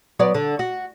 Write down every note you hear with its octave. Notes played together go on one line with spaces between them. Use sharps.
F#3 B3 D5
D3
F#4